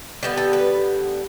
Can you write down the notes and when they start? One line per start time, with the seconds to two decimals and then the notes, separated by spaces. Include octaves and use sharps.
0.23 D3 G3 B3
0.37 A4
0.53 B4